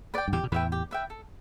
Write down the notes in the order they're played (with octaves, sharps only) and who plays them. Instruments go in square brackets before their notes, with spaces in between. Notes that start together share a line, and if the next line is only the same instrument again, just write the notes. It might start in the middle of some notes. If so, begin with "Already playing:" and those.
[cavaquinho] B4 D5 G5
[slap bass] G2
[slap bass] E2 A2 [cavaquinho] G4
[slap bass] B2
[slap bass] E2 A2 [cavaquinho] B4 E5 G5
[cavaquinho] G4
B4 E5 G5
A4